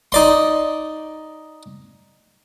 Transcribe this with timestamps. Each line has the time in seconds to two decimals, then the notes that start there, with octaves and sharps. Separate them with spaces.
0.12 D#4 D5 C6